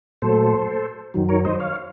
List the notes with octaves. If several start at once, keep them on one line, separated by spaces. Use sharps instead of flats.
A#2 F#3 A3 A4 C5
F#2 D#3 F#3
A#4 C#5
C5 D#5
C#5 F5